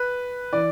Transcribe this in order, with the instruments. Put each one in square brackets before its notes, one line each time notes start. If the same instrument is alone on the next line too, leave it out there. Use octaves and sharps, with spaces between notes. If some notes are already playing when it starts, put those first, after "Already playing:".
Already playing: [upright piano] B4
E3 D5